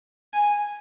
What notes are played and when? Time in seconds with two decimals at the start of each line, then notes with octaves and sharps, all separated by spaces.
0.34 G#5